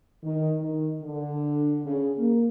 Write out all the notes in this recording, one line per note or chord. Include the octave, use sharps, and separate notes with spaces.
D#3
D#3
D3
C#3
A#3